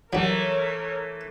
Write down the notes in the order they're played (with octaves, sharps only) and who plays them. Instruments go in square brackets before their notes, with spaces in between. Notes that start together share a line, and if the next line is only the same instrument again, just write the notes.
[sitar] E3 A3 [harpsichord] F#3 G3 [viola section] A#4 C#5